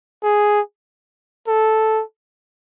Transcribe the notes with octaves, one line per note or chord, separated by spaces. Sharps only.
G#4
A4